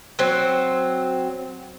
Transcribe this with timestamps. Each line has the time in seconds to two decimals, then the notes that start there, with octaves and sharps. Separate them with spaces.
0.19 F#3 C4